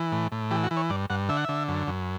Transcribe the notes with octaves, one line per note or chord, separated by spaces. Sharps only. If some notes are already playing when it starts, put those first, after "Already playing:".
Already playing: E3
A2
A2
E3 G4
F#4
E3
C#5
G2 D5
G2 F#5
D3 E5
F#5
D3 E5
F#2
F#2